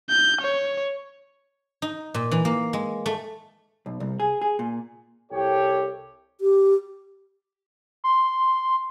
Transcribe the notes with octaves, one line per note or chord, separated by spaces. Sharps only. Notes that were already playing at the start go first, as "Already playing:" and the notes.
G6
C#5
D#4
A#2
E3
A#3
G#3
A3
B1
C2
G#4
G#4
A#2
C2 G4 A4 C#5
G4
C6